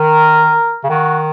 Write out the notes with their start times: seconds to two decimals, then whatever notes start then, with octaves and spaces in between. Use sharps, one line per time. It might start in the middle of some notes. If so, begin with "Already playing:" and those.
Already playing: D#3 A#4
0.84 C#3
0.90 D#3 F#4